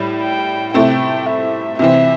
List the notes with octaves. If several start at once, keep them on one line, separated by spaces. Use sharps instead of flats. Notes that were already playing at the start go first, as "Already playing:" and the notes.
Already playing: A2 G3
G5
C3 A3 C4 E4 G5
E5
C3 E3 C4 E5